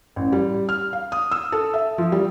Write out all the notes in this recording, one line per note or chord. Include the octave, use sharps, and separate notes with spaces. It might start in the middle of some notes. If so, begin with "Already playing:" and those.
A1
G3
F6
F5
D#6
E6
A4
E5
F3
G3